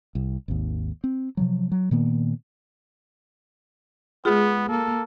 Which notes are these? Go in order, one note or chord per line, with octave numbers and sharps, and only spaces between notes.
C2
G#1 D#2
C4
C3 F3 F#3
F#3
A#2 D#3 A#3 B3
G#3 B3 F4 G#4
A#3 A4